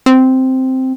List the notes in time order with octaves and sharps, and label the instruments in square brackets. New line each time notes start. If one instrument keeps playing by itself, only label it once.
[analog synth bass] C4